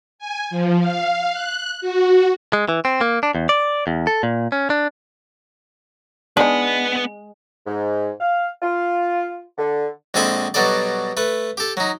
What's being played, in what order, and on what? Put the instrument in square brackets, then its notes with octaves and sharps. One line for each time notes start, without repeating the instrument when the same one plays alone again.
[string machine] G#5
F3
F5
F#6
F#4
[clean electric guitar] G#3
E3
C4
A#3
D4
E2
D5
E2
A4
A#2
C#4
D4
[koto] G#3 [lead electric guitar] B3 B4 [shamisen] D4 D#4
[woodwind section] G#2
F5
F4
D3
[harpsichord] A#1 G#3 C4 A4 G#5 B5
B2 F#3 G3 A4 D5
A3 B4
G4 A4
F#3 D#4